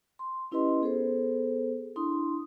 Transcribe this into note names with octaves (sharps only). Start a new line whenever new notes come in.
C6
C#4 E4 G4 B4 D#5 C6
B3 G#4 A4 C5
D4 E4 C6 D#6